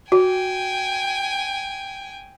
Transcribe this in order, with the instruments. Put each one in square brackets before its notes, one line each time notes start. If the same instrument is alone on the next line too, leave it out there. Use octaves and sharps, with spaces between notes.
[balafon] F#4 [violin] G5 G#5